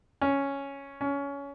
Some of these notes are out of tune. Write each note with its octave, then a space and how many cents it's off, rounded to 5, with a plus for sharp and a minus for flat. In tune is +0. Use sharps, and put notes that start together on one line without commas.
C#4 +0
C#4 +20